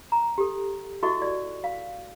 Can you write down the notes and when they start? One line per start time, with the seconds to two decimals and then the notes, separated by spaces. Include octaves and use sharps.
0.12 A#5
0.38 G4 A4
1.03 E4 F#4 A4 D#5 E5 C#6
1.22 D5
1.64 F5